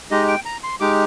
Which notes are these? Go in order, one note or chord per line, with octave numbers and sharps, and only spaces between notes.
G#3 D#4 G4 D#5
G5
A#5
C6
G#3 D#4 G4 D6